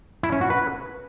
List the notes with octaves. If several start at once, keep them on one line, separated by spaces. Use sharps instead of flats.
E4
C#4
F#4
B4